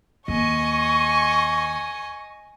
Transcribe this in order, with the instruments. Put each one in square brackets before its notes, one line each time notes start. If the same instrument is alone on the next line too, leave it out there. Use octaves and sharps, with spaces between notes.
[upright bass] D#2 [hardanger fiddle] D#5 G#5 [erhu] C#6